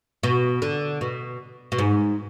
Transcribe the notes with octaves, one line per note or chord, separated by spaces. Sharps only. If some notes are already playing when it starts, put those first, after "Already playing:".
B2
D3
B2
B2
G#2